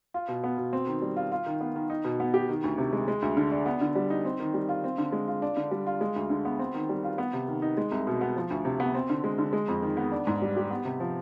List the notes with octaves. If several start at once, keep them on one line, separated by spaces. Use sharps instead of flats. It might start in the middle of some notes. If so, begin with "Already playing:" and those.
F4
B2
B3
B2
C4
D#3
G3
F4
F4
D#3
B3
D#3
D#4
B2
B3
G4
D#3
D2
C3
G#3
G#3
D2
D3
D4
B3
D3
G3
D#4
C4
D#3
G3
F4
C4
D3
G#3
F4
D4
D3
G3
F4
G#3
D2
D3
B3
C4
D#3
G3
F4
B3
C3
D#3
D#4
G#3
C2
B2
B3
F3
D2
C3
B3
C4
D3
G#3
D3
G#3
F2
D#3
B3
D4
G#2
G3
G4
B3
C3
F3